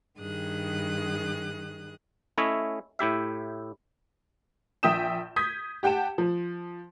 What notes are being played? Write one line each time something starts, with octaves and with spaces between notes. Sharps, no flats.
G2 D#3 G#4 D#6 F#6
A3 C#4 E4 C#5 D#5 E5
A2 E4 G4 E5
A#1 E5 G5 D#6 G6 E7
D#6 G6 G#6 B6
G4 F#5 G5 A5 E7
F3